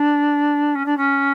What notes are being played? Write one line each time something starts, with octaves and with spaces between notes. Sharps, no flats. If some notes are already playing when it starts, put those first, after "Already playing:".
Already playing: D4
C#4
D4
C#4